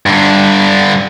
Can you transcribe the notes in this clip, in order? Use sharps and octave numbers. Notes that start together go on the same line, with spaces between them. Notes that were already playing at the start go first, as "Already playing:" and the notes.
G2 D3